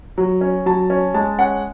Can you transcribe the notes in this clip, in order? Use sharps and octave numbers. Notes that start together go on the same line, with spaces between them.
F#3
C#4
F#3 A5
C#4
G#3 A5
C#4 F#5